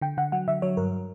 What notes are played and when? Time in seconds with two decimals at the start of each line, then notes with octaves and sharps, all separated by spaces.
0.01 D3 G5
0.17 D3 F#5
0.32 F#3 F#5
0.48 D3 E5
0.62 F#3 C#5
0.77 G2 A#4